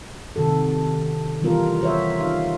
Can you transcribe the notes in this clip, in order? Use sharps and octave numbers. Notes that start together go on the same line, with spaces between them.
C3 D#3 F#4 A4
E3 G3 B3 F4 A#4
F#4 C5 C#5 E5
D#4 F4 F5